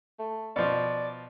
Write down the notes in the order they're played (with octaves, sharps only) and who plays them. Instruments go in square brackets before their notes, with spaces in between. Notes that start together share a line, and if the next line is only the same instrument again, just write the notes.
[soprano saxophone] A3
[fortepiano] B2 F3 [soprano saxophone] D5